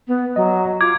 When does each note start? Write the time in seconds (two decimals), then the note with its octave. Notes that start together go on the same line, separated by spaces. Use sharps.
0.08 B3
0.36 F#3 D#5
0.81 F4 D6 G#6